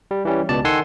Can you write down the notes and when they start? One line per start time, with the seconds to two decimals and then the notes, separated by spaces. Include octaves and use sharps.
0.11 G3
0.25 E3 G3 C#4
0.49 C#2 B2 D5 A5
0.65 D#3 A4 F#5 G#5 C6 E6